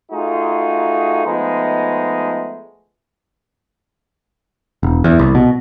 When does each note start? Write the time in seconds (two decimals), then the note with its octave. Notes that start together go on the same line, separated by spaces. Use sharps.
0.12 A3 D#4 F4 F#4 G#4
1.26 F3 G#3 A3 B3 D#4
4.83 E1
5.04 E2
5.19 C2
5.35 B2